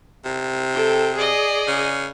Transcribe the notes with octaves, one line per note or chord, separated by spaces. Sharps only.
C3
A4 G5
G#4 D5 D#5
C#3